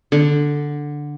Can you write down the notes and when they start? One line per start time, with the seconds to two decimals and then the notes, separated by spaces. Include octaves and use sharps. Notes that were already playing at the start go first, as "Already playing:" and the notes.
0.12 D3